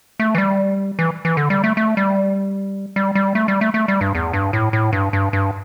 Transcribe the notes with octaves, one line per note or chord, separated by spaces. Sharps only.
A3
E3
G3
E3
E3
D3
G3
A3
A3
G3
G3
G3
A3
G3
A3
A3
G3
G2
E2
G2
A2
A2
G2
G2
G2